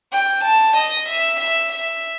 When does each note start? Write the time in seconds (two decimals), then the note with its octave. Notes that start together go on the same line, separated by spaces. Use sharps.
0.12 G5
0.44 A5
0.76 D#5
1.09 E5
1.40 E5
1.73 E5